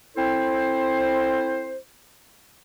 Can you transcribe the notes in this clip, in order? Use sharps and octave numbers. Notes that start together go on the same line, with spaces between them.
C4 E4 A4 C5